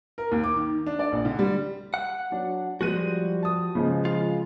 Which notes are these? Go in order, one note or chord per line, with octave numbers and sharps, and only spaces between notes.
A#4
D#2
D6
D#3
D4
D5
A#1
D3
G3
F#5
F#3 D4
F3 G3 G#3 F#4 F#6 D#7
A5 D#6
C#3 F3 G#3
F4